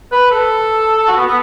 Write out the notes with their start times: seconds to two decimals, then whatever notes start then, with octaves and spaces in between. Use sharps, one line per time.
0.12 B4
0.31 A4
1.08 F#4
1.17 B3
1.27 B3